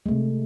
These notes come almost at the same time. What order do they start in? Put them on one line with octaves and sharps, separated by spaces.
G#3 A3 C3